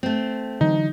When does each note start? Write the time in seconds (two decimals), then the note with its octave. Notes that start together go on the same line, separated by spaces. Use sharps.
0.03 A3 C4
0.61 D3 E3 F#3 D#4